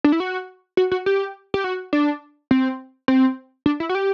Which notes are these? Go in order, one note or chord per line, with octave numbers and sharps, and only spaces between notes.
D4
E4
F#4
F#4
F#4
G4
G4
F#4
D4
C4
C4
D4
E4
F#4
G4